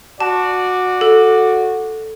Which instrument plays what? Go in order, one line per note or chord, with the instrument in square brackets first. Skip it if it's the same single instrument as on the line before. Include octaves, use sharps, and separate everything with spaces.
[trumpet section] F#4 D5 [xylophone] A5
[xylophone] A4